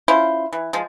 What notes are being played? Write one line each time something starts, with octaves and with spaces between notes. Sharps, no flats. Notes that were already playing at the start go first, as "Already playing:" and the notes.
C#4 E4 F4 C5
E3
F3 G#3